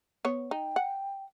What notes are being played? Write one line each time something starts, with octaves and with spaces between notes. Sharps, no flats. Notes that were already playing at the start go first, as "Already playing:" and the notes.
B3 C#5
D#4 G5
F#5